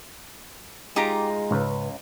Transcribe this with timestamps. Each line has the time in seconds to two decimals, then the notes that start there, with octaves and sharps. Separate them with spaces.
0.96 G#3 D#4 F4 G4 A#5
1.51 C#2 G#2 C#3 B4